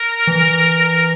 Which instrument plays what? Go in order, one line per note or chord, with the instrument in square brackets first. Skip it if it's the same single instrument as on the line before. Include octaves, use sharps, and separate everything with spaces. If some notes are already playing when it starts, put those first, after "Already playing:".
Already playing: [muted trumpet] A#4
[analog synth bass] E3